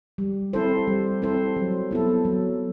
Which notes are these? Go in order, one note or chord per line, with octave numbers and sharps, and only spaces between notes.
G3
C4 E4 A4 C5
G3
C4 E4 A4 C5
F#3
B3 E4 A4
F#3